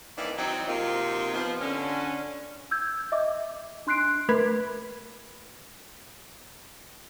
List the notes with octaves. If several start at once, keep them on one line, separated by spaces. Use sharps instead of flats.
D#3 E3 A#3 C4 D4 D5
E3 F#3 C4 D#4
C3 F#3 A#3 D#4 F4
F3 B3
D3 C#4
E6 G6 G#6
D#5 E5 D6
D4 C6 F#6 C7 D7
A3 A#4 B4 B5 G#6 B6